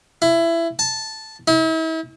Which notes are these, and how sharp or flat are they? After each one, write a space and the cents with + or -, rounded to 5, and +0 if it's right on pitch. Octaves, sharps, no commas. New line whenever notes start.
E4 +20
A5 -5
E4 -40